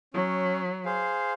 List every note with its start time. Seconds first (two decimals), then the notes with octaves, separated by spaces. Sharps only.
0.14 F#3 C#4
0.85 G#4 C5 F5